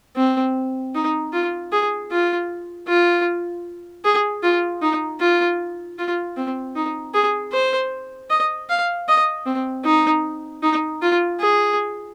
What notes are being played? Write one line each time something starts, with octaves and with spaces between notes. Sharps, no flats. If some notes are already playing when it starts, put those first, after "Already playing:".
C4
D#4
F4
G#4
F4
F4
G#4
F4
D#4
F4
F4
C4
D#4
G#4
C5
D#5
F5
D#5
C4
D#4
D#4
F4
G#4